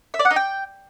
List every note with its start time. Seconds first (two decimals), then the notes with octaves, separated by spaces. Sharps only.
0.14 E5
0.19 D5
0.25 F#5
0.31 D#4
0.36 G5